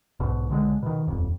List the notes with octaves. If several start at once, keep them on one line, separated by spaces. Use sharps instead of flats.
B1 G#2 B2
B1 D3 F#3 G#3
B2 D#3
D#1 F2